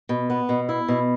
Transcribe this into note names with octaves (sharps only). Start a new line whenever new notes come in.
B2
B3
B2
E4
B2